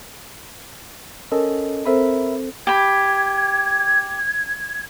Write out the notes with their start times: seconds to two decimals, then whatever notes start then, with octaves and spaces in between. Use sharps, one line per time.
1.32 C#4 A4 A#4 D#5
1.85 C4 A4 A#4 C5 E5 B5
2.67 G4 B5 G#6